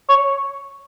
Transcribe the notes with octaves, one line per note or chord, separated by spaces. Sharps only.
C#5